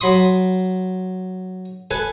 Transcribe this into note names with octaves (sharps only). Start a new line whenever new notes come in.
F#3 B5 C6 D#6
A4 B4 G#5